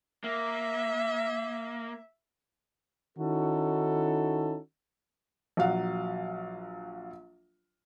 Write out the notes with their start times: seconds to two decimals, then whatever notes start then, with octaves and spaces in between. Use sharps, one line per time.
0.24 A#3 E5
3.18 D#3 C#4 D#4 E4 F#4 A4
5.57 A#1 F#3 F5 F#5